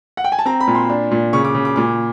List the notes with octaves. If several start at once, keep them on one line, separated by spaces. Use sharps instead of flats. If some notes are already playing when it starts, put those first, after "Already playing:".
F#5
G5
G#5
A5
C4 A#5
B5
A#2
C6
D4
A#2
C#3 C#6
D6
C#3
D6
A#2 D6